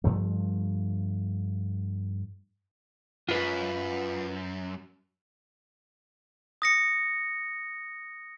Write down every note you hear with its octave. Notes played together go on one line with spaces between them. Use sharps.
G2 F3 A3
F#2 F4 B4
D#6 A#6 C#7